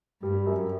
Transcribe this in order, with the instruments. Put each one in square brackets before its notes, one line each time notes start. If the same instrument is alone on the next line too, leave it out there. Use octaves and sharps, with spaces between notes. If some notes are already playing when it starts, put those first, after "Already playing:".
[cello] G2 [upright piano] G3
[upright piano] F#2